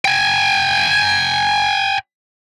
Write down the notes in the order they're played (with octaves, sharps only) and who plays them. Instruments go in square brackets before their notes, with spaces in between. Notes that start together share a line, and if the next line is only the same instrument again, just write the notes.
[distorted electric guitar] G5 G#5